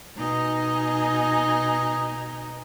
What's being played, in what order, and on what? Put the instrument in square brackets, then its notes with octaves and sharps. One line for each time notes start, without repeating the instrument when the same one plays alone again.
[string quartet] B2 D#4 D#5 G#5 A#5